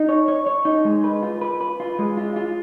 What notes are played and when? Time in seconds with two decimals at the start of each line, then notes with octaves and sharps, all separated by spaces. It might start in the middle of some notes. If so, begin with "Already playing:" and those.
Already playing: D#4
0.09 C#5
0.28 C#5
0.47 C#5
0.65 D#4
0.85 G#3
1.04 B4
1.23 F4
1.41 B4
1.61 B4
1.80 F4
1.99 G#3
2.17 F4
2.36 F4